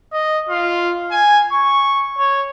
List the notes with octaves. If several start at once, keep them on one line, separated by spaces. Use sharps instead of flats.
D#5
F4
G#5
C#6
C#5